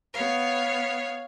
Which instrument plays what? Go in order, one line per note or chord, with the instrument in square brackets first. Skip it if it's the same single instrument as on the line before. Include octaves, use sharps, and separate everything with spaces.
[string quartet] B3 C#5 F5